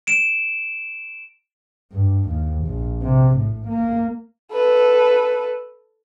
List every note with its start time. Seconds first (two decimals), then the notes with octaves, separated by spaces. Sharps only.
0.07 D7 E7
1.92 G2
2.29 D#2
2.66 A#1
3.03 C3
3.37 A2
3.68 A#3
4.52 A4 B4